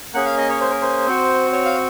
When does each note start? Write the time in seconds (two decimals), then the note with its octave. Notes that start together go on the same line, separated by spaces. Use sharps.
0.14 A#3 C#4 G#4 F#5
0.25 F5
0.38 D#5
0.49 C#5
0.61 C5
0.70 A#4
0.82 C5
1.06 C4 F#4
1.53 C#5
1.65 F5